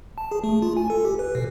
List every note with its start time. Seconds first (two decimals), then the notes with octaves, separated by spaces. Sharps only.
0.18 A5
0.31 G#4
0.44 A3
0.62 F4
0.77 G#5
0.90 A4
1.05 G4
1.19 B4
1.35 B2